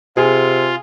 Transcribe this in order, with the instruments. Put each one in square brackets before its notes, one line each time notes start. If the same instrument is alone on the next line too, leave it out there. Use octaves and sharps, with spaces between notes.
[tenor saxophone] C3 [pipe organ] F4 [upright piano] G#4